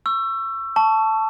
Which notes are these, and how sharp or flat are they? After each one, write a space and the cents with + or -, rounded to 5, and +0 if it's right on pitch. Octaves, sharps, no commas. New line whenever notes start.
C#6 +0 E6 +25
A5 +0 C#6 +20